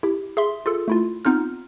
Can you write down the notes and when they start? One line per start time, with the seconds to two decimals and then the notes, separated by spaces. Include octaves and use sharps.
0.03 E4 G4
0.37 G#4 E5 C6
0.66 F4 G#4 A4
0.88 A3 E4 F4
1.25 B3 C4 D#4 F4 F6